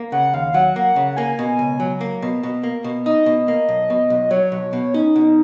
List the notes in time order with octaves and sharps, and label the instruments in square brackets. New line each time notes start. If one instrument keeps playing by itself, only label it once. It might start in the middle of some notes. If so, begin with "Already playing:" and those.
Already playing: [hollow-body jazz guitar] A#3
[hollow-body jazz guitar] C#3 [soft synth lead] F#5
[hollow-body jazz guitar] D#2 [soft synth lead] F5
[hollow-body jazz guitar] F#3 [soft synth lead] F#5
[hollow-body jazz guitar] A#3
C#3
[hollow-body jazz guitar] A#3 [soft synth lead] G#5
[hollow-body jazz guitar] B2
C#2
F#3
A#3
B2
B2
A#3
B2
[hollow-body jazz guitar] D#4 [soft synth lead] D#5
[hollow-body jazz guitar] B2
A#3
B1
B2
B1
[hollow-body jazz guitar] F#3 [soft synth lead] C#5
[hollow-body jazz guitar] B1
B2
[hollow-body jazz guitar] C#4 [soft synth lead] D#4
[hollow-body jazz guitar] B2